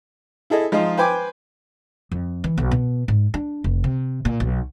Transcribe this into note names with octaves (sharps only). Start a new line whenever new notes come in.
E4 G#4 A4 D#5
F3 G#3 D#4 F4
B4 C5 G5 G#5 D6
F2
E3
B1
B2
G#2
D4
F1
C3
A#2
B1